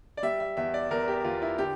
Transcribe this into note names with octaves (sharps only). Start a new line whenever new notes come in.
D5
G3 E5
E5
E2 E5
D5
E2 A#4
G4
E2 F4
E4
D3 G4